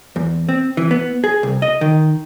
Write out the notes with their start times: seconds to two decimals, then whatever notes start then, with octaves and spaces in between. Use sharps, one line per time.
0.16 E2
0.49 C4
0.77 E3
0.91 B3
1.24 G#4
1.43 C2
1.62 D#5
1.81 D#3